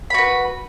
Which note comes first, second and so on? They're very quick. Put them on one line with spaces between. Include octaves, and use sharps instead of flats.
B5 F#4 B4